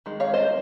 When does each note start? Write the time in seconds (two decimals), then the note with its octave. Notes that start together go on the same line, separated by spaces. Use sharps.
0.06 D#3 G#3
0.20 C#5 F5
0.34 C5 D#5